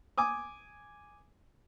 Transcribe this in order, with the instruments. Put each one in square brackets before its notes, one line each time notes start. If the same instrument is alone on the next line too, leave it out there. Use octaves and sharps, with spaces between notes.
[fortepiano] G#5 D6 D#6